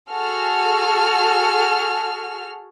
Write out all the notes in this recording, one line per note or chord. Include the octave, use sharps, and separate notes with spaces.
F#4 G#4 A4 F6